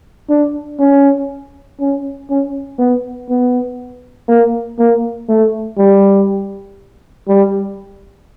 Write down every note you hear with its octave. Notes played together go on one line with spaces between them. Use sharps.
D4
C#4
C#4
C#4
B3
B3
A#3
A#3
A3
G3
G3